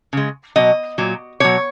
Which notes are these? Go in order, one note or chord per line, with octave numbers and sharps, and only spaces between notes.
C#3 G#3
B2 F#3 D#5
A#2 F#3
B2 F#3 C#5